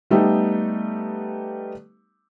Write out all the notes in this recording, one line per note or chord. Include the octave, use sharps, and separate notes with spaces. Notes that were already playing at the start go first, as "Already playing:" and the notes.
G3 A3 B3 D#4 G4